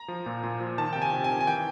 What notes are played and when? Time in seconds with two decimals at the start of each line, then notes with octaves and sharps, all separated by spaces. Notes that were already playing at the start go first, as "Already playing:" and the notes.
Already playing: A#5
0.08 F3
0.26 A#2
0.44 A#2
0.61 F3
0.78 D#3 A5
0.93 C3 G5
1.02 G#5
1.13 C3
1.24 G#5
1.30 D#3
1.41 G#5
1.47 E3 G5